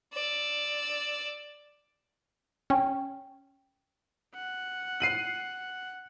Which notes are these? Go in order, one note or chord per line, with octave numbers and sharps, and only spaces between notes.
D5 E6
C#4 G5
F#5
C7 D#7 F#7